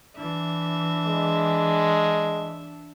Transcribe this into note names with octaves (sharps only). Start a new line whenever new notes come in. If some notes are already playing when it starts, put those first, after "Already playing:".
E3 D4 E5
G#3